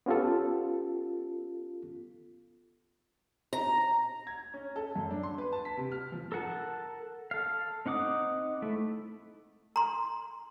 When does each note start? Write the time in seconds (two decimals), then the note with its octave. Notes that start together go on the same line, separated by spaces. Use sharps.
0.06 B3 C#4 F4 G4 A4
3.53 A#5
4.27 G#6
4.54 C#4
4.76 A4
4.96 F#2
5.11 D4
5.23 C6
5.38 B4
5.52 A5
5.65 B6
5.77 C3
5.92 F6
6.12 F3
6.32 A4 A#4 F#5 A5
7.31 A4 F5
7.86 C4 D#4 F#5 D6 D#6
8.62 A3 E4
9.76 A#5 C6